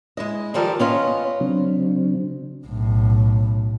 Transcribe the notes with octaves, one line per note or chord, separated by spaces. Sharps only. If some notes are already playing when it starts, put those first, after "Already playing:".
G#3 E4 D#5
D#3 F3 G3 G4 A4 A#4
B3 C#4 F4 C#5 D#5
C#3 F#3 C4 D4
B1 A2